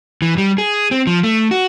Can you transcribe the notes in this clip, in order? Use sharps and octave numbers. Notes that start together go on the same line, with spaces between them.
E3
G3
G#4
C4
F3
A3
F#4